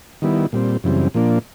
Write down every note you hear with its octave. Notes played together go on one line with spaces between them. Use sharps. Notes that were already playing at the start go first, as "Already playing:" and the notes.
D#3 G3 B3 E4
A#2 G3 C4
F#2 C#3 E3 G3 C4
A#2 F3 A#3 D4